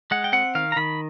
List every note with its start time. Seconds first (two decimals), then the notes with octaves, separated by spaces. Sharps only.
0.11 G#3 F#5
0.24 G5
0.33 C4 F#5
0.55 D#3 F5
0.72 A#5
0.76 D#3 B5